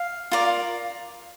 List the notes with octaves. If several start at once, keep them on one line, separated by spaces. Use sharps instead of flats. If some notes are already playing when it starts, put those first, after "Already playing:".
Already playing: F5
F4 A#4 D5